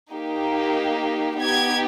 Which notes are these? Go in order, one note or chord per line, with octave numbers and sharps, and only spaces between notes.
A#3 D#4 G4
B3 D#4 G4 G#6